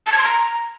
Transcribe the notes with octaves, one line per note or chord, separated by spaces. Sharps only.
A5
G#6
C6
A#5